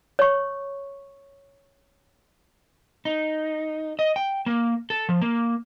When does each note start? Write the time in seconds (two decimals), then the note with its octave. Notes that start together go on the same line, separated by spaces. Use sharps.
0.19 C#5 C#6
3.05 D#4
3.99 D#5
4.16 G5
4.46 A#3
4.90 A4
5.09 F3
5.21 A#3